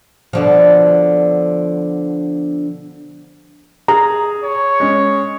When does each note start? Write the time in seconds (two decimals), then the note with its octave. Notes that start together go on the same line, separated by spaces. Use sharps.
0.33 B2 D3 F3
3.88 G#4 A#5
4.44 C#5
4.80 G#3 C#4